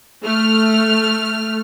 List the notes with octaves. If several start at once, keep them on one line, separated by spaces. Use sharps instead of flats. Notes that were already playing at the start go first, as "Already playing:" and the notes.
A3 F6